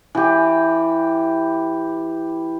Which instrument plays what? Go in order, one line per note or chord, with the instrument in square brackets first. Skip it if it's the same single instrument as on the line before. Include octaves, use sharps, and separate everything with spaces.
[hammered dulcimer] E3 G4